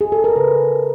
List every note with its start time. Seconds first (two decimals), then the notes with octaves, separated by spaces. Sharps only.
0.01 G#4
0.12 A4
0.24 A#4
0.36 C#3 B4